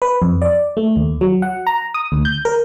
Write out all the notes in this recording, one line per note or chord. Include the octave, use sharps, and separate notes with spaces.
B4
F2
D5
A3
D#2
F#3
F#5
A#5
D#6
D2
G6
A#4